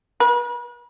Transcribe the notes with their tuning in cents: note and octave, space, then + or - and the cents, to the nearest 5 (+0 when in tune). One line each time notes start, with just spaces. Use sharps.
B4 -40